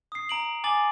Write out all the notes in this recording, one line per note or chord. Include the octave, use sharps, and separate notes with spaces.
D#6 C7
A#5 D7 F#7
G#5 D6 A6 F#7